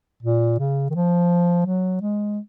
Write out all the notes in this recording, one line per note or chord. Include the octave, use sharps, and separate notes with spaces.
A#2
C#3
D#3
F3
F#3
G#3